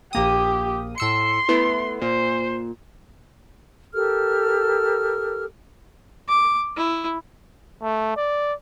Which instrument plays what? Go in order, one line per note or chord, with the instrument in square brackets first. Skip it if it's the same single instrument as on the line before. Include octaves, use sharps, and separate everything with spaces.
[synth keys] A#1 A#3 D#6 [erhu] G4
[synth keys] A2 E6 C#7 [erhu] C6
[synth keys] A3 B3 E4
[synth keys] A#2 [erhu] C5
[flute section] G4 A4 A#4 F6
[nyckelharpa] D6
E4
[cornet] A3
D5